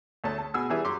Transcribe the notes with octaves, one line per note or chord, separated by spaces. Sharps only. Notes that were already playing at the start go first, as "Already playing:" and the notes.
D2 A3 C#5 A5
A5
B2 F#4 G#4 G#5 E6
E3 G3 G#4 E5
F#2 C6 D6